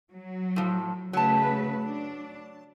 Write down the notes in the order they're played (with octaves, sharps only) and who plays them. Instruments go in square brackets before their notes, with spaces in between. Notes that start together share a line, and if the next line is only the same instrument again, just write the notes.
[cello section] F#3
[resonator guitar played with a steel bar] A2 F3
[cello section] C#3 A3 B4 [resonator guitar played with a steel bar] F#3 A5
[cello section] D4